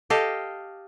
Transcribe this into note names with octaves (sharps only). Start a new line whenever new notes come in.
G4 A4 D#5 F5